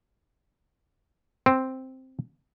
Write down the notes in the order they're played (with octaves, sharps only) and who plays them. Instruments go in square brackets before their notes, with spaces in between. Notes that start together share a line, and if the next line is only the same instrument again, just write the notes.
[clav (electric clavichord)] C4